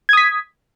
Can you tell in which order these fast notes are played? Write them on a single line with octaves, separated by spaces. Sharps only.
G#6 D#6 B6